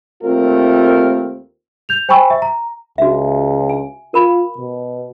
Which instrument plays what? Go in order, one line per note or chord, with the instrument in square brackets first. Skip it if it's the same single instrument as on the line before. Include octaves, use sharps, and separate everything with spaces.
[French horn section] D#2 A3 C4 F4 A#4
[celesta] G6 F7
C5 G5 G#5 B5 C#6 E6
E5
A#5
[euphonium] C#2 [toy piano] F#4 E5
[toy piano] G#5
[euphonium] F4 [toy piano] A#4 B5
[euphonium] B2